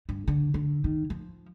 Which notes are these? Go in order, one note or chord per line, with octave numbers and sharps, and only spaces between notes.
G2
D3
D3
D#3
F3